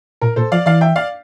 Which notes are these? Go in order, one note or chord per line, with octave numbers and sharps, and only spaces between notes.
A#2 A#4
A#2 A4 C5
F3 D5 F5
E3 D5 F5
E5 G5
D5 F5